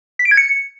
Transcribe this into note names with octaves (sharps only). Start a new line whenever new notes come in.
B6
D7
G#6
C#7